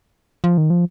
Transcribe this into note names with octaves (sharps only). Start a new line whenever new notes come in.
F3
D#3
F3